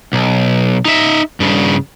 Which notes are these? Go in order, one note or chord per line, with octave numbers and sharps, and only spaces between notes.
B1
D#4 E5
G2 C#3